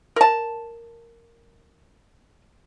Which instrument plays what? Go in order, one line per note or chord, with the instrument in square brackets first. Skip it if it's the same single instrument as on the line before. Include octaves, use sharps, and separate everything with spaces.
[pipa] A#4 A5